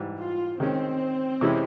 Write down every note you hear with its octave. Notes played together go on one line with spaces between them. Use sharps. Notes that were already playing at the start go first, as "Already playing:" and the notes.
Already playing: G#2 E3 G3
F4
D#3 G#3 C4 C#4
C3 E3 G#3 C#4 E4